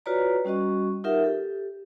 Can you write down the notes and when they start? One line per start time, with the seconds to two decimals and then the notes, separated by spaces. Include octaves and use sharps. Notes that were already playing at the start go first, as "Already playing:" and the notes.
0.06 F4 F#4 B4 C#5 D5 A#5
0.45 G3 C#4 F#4 D#5 C#6
1.04 D#4 F4 G4 A#4 E5 F#5
1.24 G4 A4